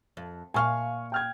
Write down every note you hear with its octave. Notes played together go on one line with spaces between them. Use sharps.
F2
A#2 C5 F5 G#5 C#6 F6
G5 F6 G#6